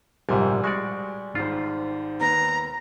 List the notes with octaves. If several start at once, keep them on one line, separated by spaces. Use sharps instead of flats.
A#1 G#2 C3 G3 G#5
G#3 F#4 D5 G#5 C#6
G#1 G#2 F4
D#2 B3 A#5